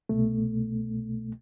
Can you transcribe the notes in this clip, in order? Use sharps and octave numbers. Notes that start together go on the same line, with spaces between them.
C2 B2 A3